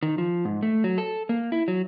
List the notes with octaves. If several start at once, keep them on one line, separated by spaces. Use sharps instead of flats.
D#3
F3
G#2
A3
F#3
A4
A#3
E4
F#3